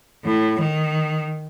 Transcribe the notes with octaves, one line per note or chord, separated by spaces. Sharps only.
A2
D#3